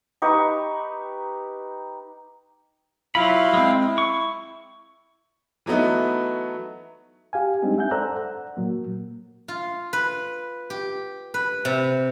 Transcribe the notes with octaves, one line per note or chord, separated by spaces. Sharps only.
D#4 G4 B4 C#6
F#3 E4 F4 F5 B5
G#3 C4
E4
C#6
E3 F#3 A3 B3 D#4
G4 F5 G#5
G3 G#3 C4 D4 D#4 G4
E5 F#5 G#5 G6
A4 C5 D5 A#5 E6 F#6
F#5
A#2 F#3 A#3
F4
B4
G4
B4
C3